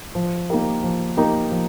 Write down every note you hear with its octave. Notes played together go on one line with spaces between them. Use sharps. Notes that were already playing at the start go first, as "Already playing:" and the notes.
F3
A#3 D#4 G4 A#4
F3
A#3 D#4 G4 A#4
F3